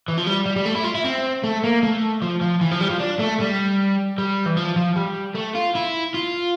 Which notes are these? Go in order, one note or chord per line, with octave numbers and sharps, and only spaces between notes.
E3
F3
G3
G3
G3
A3
E4
F4
E4
C4
A3
A#3
A3
F3
F3
E3
F3
G3
F3
D4
A3
G3
G3
E3
F3
F3
G3
A3
F4
E4
F4